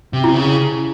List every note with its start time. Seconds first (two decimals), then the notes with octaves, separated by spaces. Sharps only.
0.13 C3
0.24 E4
0.34 C#3